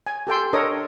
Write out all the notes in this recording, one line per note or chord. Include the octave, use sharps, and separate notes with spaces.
G#5
G4 A4 G5 C6
D4 A4 A#4 C#5 D#5 D#6